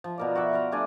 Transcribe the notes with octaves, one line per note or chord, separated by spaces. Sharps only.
F3
B2 A#4 D5
F#4 D5 E5 B5
F5 A#5 C6
G3 A3 D4 G#5